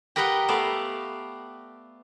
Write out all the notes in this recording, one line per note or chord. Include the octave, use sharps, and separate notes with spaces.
G4 A#4 B4 D#5 F#5 G5
A3 B3 D5 F5